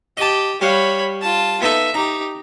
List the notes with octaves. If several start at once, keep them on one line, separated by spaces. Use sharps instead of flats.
G4 D#5 A5
G3 C#5 F5 F#5 B5
F4 A5
B3 D#4 A4 E5
D#4 G4 A#5